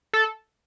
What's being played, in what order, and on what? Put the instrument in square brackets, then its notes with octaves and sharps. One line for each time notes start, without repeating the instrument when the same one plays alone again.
[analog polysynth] A4